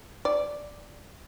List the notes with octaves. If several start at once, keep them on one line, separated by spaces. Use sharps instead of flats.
D5